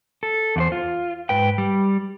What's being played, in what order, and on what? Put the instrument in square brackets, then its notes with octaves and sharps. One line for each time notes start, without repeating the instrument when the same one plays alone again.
[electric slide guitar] A4
E2 E4 C5
F4
G#2 B4 G5
G3